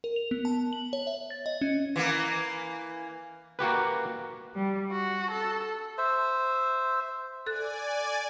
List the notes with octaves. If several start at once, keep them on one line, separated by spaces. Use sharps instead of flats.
A#4
F7
B3
A5
F#7
C#5
E5
A6
D#5
C#4
E3 A#3
A#3 F#4 G4 B4
G3
F#4
A4
C5 E5
A4 D5 G#5 F#6